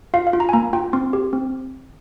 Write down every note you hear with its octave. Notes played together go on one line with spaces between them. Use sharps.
F4 F5
F5
F4
A#5
G#5
A#3 A#5
F4 G5
C4 C6
G4
C4